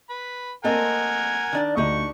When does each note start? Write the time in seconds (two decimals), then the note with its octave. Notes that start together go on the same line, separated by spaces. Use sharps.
0.10 B4 B5
0.64 A3 A#3 C4 A#4 D#5 F#5 G#5
1.53 D#3 D4 D5
1.77 D2 D4 D#4 G4 C#6